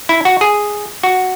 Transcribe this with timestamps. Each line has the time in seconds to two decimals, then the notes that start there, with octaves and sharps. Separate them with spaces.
0.09 E4
0.25 F#4
0.41 G#4
1.03 F#4